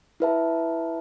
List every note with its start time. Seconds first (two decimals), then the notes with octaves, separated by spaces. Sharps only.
0.20 E4 B4 E5 A5